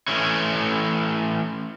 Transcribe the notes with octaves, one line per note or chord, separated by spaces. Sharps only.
E3 A3 C#4